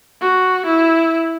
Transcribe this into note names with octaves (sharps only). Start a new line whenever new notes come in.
F#4
E4